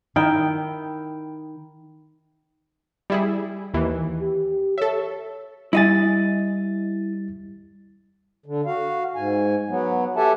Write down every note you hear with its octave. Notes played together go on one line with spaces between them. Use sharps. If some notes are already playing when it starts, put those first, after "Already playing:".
D#3 E4 G5
G3 E4 G#4
D#2 E3
G4
A4 C#5 E5
G3 E4 D#5 G#5 A6
D3
F#4 F5
G#2 G#5
F#3 B3
G4 A4 E5 F#5 G#5 A5